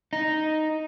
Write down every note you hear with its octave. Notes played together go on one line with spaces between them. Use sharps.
D#4